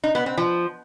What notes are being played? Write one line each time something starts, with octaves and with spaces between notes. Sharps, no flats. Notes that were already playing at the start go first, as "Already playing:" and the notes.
D#4
B3
C4
F3